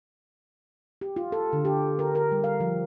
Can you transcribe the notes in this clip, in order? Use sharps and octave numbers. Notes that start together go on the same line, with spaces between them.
G4
F4
A4
D3
G4
A#4
A#4
G3
F5
F3